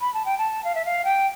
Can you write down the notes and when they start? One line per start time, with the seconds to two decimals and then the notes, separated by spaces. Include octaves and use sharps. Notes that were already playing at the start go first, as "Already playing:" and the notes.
0.01 B5
0.14 A5
0.25 G5
0.38 A5
0.64 F5
0.75 E5
0.85 F5
1.05 G5